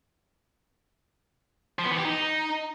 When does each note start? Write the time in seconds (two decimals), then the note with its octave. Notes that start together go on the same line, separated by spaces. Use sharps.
1.79 F3
1.85 B3
1.92 E3
1.98 G4
2.05 D#4